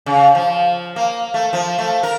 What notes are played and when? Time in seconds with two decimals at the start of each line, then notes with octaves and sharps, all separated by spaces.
0.06 C#3
0.35 F3
0.96 A#3
1.34 A3
1.53 F3
1.79 A3
2.03 A#4